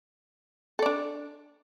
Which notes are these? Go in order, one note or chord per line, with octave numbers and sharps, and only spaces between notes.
D4 A4 D5